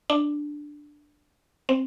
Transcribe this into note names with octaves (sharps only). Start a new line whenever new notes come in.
D4
C4